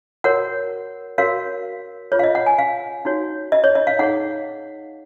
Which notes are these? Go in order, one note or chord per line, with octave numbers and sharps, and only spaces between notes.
F#4 A#4 C#5 F#5
F#4 A#4 C#5 F5
F4 G#4 B4 C#5
F5
D#5
F#5
G#5
F5
D#4 F#4 C#5
D#5
C#5
D#5
F5
D#4 G#4 C#5 F#5